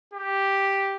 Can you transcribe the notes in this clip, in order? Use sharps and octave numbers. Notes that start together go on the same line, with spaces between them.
G4